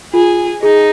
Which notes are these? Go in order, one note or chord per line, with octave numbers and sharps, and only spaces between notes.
F4 G#4
D#4 G#4